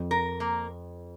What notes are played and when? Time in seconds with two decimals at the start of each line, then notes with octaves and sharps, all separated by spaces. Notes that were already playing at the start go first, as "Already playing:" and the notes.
Already playing: F2
0.11 A#4
0.40 A#3